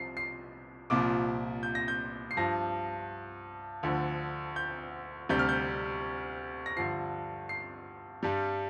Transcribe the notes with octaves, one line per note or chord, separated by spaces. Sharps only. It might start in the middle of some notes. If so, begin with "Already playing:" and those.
Already playing: C2 C3 F3 C7
C7
C2 A#2 F3 D6
G6
A#6
G6
C7
G2 F3 A#6
D2 D3 F3
G6
D2 C3 G3 G6
F6
G6
A#6
G2 D3 F3 C7
C7
G2 G3